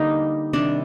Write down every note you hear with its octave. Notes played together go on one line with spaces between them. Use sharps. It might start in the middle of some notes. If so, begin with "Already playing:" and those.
Already playing: D3 G3 A#3 D#4
C3 D#3 G3 D4